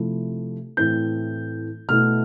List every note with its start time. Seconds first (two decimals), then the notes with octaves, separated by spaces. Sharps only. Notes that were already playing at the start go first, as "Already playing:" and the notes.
Already playing: C3 F3 A3 E4
0.77 A2 E3 A3 C4 G6
1.88 B2 A3 E4 F6